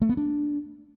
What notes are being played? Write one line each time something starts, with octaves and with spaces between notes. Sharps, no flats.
A3
B3
D4